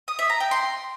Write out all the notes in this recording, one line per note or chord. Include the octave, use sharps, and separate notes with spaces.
D#6
E5
A#5
G5
C6